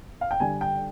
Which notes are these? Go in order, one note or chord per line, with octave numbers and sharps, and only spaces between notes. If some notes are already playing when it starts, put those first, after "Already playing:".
F5
G5
D3 G3 G#5
G5